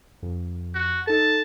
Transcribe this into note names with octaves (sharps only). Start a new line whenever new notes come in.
F2
F#4
D#4 A4 A5